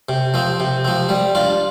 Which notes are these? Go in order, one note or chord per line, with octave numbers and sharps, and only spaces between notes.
C3
F3 C4
C3
F3 C4
G3
D4 F4